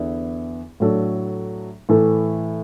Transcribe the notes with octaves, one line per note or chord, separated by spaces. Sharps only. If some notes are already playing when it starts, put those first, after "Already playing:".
Already playing: E2 D3 B3 E4
A2 F#3 D4 A4
A2 E3 A3 E4 A4